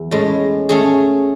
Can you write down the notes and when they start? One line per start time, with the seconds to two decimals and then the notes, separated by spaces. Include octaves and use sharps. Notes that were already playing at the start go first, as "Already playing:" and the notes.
Already playing: E2
0.11 A2 G#3 C#4
0.69 A3 C#4 G#4